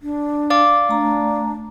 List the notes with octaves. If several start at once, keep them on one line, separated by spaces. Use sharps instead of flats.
D4
D5 F5 D6
A3 D4 A#5